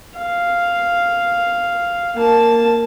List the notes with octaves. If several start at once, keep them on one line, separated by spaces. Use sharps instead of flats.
F5
A#3 A5